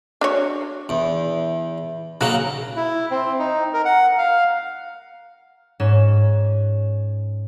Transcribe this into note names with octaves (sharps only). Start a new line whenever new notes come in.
D4 F#4 C#5
E2
C#3 F#3 A#3 F#4 C#5
E4
C4
D#4
A#4
F#5
F5
G#2 C#4 E7